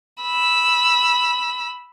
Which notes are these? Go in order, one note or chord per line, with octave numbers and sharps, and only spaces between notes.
B5 E6